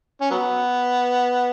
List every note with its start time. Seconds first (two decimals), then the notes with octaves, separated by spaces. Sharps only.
0.21 C#4
0.31 F#3 B3